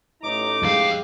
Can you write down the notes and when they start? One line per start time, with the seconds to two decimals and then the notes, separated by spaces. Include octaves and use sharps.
0.23 A1 D#4 A#5 D6
0.63 F2 G#3 G4 F5